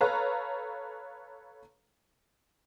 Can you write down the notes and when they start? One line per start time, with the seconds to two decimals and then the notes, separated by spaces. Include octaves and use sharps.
0.01 A4 B4 C#5 F5 A#5